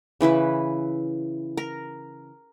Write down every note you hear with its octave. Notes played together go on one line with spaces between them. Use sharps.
C#3 E3 E4 B4
A#4